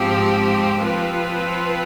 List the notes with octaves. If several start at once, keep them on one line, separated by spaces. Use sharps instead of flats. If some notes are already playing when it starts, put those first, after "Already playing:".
Already playing: G#2 F3 C4 G4
F3 C4 F4 B4